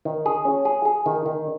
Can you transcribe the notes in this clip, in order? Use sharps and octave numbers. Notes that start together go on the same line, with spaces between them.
D#3
G#4
C#4
G#4
G#4
D#3
D#3